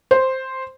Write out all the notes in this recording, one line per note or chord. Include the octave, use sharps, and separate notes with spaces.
C5